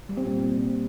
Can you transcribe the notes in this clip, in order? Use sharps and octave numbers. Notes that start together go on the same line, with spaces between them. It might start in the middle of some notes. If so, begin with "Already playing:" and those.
G3
C4
A#2